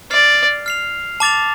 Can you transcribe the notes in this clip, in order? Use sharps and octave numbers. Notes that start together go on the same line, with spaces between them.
D5 F6 C7 F7
F6 C7 F7
A5 D6 A6 F7